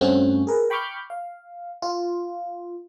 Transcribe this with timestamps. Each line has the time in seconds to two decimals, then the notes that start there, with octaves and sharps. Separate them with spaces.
0.01 G2 A3 C4 C#4 F#4
0.47 G#4 A#4 B4
0.70 G5 B5 C#6 D6 F6 G6
1.10 F5
1.82 F4